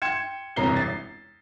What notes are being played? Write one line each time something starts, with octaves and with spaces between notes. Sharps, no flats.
G5 C6 G#6 C#7 E7
E1 C2 C#4 A#5 C7 G7
A6 C7